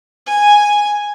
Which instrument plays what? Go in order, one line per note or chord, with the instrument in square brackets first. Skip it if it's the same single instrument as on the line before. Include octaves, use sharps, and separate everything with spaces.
[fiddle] G#5